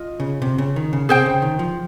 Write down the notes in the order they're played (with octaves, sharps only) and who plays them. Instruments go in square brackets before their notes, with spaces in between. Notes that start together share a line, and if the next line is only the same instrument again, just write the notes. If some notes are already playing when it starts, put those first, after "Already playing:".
Already playing: [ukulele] F4 D#5
[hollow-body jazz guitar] C#3
C3
C#3
D#3
C#3
[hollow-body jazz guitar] C3 [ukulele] G#4 C5 G5
[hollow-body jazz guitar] C#3
D#3
F3